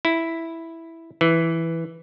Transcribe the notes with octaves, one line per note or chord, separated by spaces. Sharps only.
E4
E3